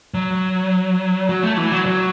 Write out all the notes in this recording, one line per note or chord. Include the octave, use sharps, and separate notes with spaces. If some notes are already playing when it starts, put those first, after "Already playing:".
F#3
F#3
A3
E3
F#3
F#3